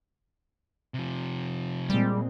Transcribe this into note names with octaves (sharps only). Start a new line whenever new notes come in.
C3 F3
A#2 G3 G#3 C4